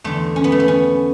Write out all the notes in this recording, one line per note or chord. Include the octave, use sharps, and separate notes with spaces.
E2 D3 A3
C#4
B3
A3
B3
C#4